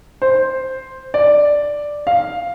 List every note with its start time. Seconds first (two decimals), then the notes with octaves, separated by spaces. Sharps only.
0.22 C5
1.14 D5
2.07 F5